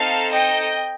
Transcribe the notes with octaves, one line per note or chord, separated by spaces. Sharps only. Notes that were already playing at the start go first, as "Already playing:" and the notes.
Already playing: C4 D#4 A4 F5 A5
D#5 G5